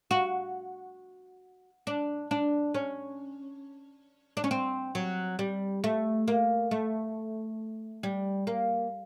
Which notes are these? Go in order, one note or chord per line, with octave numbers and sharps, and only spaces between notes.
F#4
D4
D4
C#4
D4
C#4
C4
F#3
G3
A3
A#3
A3
G3
A#3